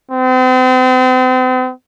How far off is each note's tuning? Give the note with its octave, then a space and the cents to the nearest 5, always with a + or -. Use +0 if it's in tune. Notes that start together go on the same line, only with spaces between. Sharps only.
C4 -40